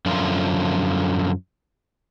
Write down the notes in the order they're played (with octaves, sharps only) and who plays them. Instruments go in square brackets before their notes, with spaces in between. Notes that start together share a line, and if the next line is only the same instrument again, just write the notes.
[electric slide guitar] F#2 D3 F3 F4